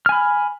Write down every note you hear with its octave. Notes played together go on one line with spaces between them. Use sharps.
G#5 B5 F6